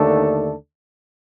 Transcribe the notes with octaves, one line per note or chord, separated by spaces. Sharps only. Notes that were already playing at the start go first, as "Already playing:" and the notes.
Already playing: D#2 D3 A3 D4 A4